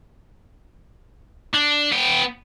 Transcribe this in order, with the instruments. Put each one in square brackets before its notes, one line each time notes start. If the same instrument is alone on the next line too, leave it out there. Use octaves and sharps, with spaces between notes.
[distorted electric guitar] D4
B3 G5